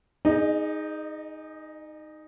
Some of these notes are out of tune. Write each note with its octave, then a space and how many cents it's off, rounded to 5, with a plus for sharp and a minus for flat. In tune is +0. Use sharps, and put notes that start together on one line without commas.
D#4 +5 G#4 +0 D#5 -40